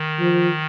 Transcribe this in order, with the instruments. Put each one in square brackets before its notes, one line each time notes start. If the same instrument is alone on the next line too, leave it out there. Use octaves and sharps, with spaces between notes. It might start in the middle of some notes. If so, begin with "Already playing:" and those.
Already playing: [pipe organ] D#3
[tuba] F3